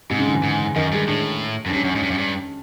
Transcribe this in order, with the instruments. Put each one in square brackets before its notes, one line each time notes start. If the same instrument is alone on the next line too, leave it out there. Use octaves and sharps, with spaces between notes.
[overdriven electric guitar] G#2 [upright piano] C3
[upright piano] C#3
D3
E3
[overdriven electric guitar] G#2
[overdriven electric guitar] F#2 [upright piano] D#3
[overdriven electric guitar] G2 [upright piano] G#3
[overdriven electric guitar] A2 [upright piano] D4
[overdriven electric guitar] F#2
[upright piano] D4
[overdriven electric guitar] G2 [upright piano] C#4
[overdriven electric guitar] F#2
[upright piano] C#4
[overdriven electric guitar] G#2
G2
F#2
G2